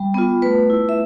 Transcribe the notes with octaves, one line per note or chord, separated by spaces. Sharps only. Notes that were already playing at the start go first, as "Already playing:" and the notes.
Already playing: G3
B3 F4
A3 B4
E4
E5